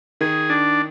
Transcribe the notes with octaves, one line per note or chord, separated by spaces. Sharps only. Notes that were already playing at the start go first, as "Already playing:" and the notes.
D#3 G#4
D4